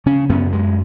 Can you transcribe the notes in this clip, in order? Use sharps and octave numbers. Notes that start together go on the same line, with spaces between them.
C#3 C#4
F#2 B3
F#2 G#3